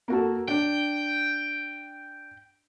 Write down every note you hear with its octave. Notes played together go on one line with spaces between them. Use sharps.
A#3 F#4 A4
D4 G5